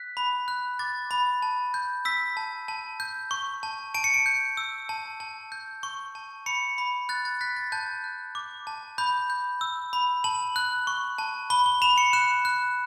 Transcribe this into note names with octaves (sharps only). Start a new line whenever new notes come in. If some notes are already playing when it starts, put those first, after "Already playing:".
Already playing: F#6 B6
B5
F#6
D6 A6
B5
A5
G6
E6 B6
A5
A5
G6
C#6
A5
A5 D7
C#7
D7
G6
E6
A5
A5
G6
C#6
A5
B5 C#7
B5
F#6 A6
A6
F#6 B6
A6
A5 G6
F#6
D6
A5
B5 G6
G6
E6
B5
A5 F#7
F#6
C#6
A5
B5 G7
G7
B5 E7
C#7
F#6 E7
F#6